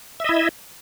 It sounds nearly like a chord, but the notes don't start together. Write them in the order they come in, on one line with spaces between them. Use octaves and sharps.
E5 D#5 E4